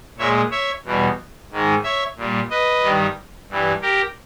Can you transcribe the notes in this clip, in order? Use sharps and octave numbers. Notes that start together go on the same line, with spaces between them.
A#2 G#3 C#5 E5
C#5 E5
E2 B2 G3
G#2 D#3 G#3
C#5 E5
A#2 G3
B4 D#5
G2 D#3 G3
G2 E3 G3
G4 A#4